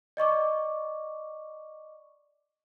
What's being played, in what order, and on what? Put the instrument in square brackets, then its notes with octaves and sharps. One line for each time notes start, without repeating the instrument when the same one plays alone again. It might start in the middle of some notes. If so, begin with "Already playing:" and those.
[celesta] D5 D#5 C#6 D6